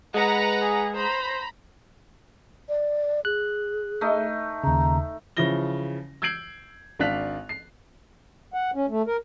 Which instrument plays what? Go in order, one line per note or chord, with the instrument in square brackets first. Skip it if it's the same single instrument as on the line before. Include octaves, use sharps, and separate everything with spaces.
[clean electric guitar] G#3 [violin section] B4 F#5 A#5
[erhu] G#4
[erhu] C5 [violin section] A#5 B5
[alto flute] D5
[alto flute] G#4 [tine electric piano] F#6
[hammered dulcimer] A3 D#4
[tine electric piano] D#2 C#3 [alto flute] A#5
[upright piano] C#3 E3 F3 E4 A#6 G7
E6 G6 G#6 C7 D7 F#7
G#1 D4 F5 F#6 B6 F7
C7
[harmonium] F#5
C#4
A3
A#4